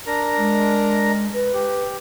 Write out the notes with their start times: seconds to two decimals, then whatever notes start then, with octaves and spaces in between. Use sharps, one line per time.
0.06 D4 A#4 A#5
0.37 G#3
1.33 B4
1.54 G4